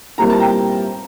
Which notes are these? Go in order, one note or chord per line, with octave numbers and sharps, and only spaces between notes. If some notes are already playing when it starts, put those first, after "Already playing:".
A#2 G3 C4 E4 A#4 A#5
A5
G5 A#5